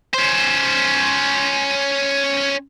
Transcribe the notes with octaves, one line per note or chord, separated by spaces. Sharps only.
C#4 C5